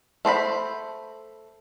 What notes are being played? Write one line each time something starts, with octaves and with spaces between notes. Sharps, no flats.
A3 C5 D5 B5